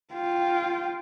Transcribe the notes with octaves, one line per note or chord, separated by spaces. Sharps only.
F4 G5